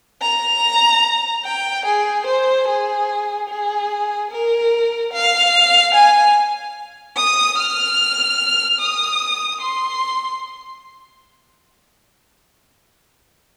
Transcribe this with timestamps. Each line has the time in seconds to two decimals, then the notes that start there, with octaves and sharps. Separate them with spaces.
0.22 A#5
1.45 G5
1.86 G#4
2.27 C5
2.68 G#4
3.49 G#4
4.31 A#4
5.12 F5
5.94 G#5
7.16 D#6
7.58 F6
8.80 D#6
9.61 C6